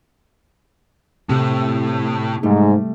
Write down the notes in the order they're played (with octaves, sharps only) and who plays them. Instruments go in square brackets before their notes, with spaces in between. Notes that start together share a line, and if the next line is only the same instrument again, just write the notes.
[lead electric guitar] A2 [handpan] C3 C4
[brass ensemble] G#2 [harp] G3 A3